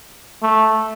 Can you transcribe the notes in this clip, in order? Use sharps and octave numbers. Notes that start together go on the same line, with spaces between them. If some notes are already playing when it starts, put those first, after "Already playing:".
A3